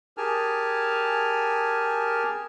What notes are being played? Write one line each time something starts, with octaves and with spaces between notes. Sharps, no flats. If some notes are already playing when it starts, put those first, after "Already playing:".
G4 G#4 A#4 G#5 A5 F6